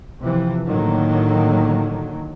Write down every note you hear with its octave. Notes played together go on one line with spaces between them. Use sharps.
C3 E3 F3
A2 D3 D#3 F#3 A#3